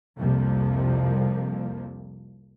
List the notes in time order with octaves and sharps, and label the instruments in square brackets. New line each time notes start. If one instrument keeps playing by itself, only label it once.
[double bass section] C2 F2 C3 F3 G3 A#3